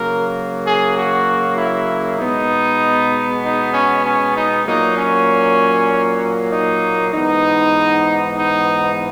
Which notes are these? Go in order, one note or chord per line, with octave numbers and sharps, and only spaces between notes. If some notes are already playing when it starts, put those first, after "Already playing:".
Already playing: C#3 F#3 A#3 A#4
G#4
F#4
E4
B2 G#3 B3 D#4
D#4
C#4
C#4
D#4
A#2 F#3 A#3 D#4
C#4
D#4
G#2 E3 B3 D#4
D#4